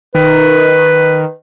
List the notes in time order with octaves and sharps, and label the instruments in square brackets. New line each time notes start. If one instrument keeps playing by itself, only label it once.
[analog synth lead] D#3 [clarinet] B4